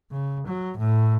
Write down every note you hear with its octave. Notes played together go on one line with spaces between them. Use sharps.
C#3
F#3
A2